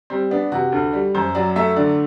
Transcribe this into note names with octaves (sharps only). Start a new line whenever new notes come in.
G3 C4
B3 D4
C3 F#4
D2
G3
F#2 C5
F#3 D5
A3 E5
D3 D5